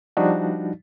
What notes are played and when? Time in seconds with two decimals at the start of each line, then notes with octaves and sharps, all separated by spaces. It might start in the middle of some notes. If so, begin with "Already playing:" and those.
0.17 F3 G3 D4 D#4 F#4